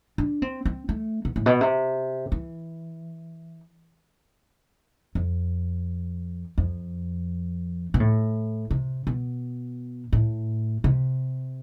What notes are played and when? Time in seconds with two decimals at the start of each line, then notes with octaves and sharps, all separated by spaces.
0.18 D4
0.42 C4
0.66 C4
0.89 A3
1.25 B2
1.36 A2
1.46 B2
1.61 C3
2.32 E3
5.15 F2
6.58 F2
7.94 B2
8.00 A2
8.71 C3
9.07 B2
10.13 A2
10.84 C3